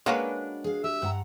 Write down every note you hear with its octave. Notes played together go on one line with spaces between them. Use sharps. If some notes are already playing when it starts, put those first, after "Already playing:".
G#3 A#3 C#4 D4 F#4 B4
G#4 F5
G4 E5 E6
G2 F#5 A#5